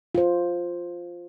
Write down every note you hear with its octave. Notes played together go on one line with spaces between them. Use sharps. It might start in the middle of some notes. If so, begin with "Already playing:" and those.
F4 C5